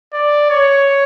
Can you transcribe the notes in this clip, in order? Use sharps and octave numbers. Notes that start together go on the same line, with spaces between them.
D5
C#5